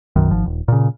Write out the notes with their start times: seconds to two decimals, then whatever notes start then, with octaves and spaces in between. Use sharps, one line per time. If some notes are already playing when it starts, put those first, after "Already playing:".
0.16 B1 F#2 D#3
0.31 G#1 F3
0.46 D#1
0.68 A#2 C#3